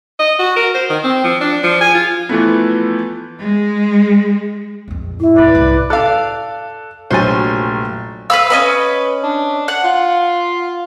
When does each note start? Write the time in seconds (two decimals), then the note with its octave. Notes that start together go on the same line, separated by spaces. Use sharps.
0.19 D#5
0.39 F#4
0.57 A#4
0.75 C5
0.90 D#3
1.04 C4
1.24 F3
1.41 D4
1.63 F3
1.81 G#5
1.94 F4
2.29 E3 F3 A3 B3
3.40 G#3
4.88 A#1 F2
5.20 A2 E4 E5
5.36 F1 D#2 B4 D5
5.55 C2 G2
5.90 A4 D5 F5 F#6
7.11 F1 A#1 F#3 C5 C#5 G#5 A6
8.30 B4 F5 B5 E6
8.50 C#4 B4 D#5 B5
9.23 D4
9.68 F#5
9.84 F4